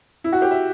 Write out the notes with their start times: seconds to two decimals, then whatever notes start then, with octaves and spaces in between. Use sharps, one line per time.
0.24 E4
0.32 F#4
0.42 G4
0.51 E5